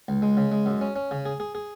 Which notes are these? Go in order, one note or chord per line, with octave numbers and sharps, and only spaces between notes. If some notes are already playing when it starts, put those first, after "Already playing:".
C#2
G#3
C#3
G#3
F#2
C#4
C#4
C#3
G#4
G#4
G#4